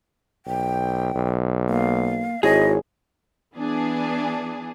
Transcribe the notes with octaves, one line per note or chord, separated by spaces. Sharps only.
B1 G5
B1
A#3 F5
G#1 E4 F#4 G#4 C#5 D#5
E3 B3 D4 G#4